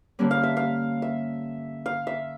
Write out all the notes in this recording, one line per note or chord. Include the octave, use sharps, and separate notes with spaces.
G2 D3 G3 A#3 C#4
F5
E5
F5
E5
F5
E5